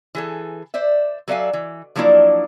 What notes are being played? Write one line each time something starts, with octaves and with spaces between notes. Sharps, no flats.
E3 G#4 A4
C5 D5 E5
F#3 A4 D5 E5 F5 G#5
E3
F3 F#3 A#3 D4 E4 D5